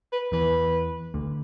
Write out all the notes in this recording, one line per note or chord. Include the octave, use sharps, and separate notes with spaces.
B4
E2 E3 B4
D2 D3